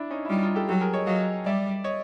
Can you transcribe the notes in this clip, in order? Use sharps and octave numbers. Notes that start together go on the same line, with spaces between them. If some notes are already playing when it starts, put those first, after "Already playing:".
Already playing: D4 E4
C#4 D#4
E4
G3 D#4 F4
D#4 F4
G4 A4
F#3 G4 A4
G#4 A#4
C#5 D#5
F#3 D#5 F5
G3 D5 E5
C#5 D#5